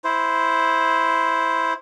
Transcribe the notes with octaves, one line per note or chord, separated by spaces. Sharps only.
E4 C5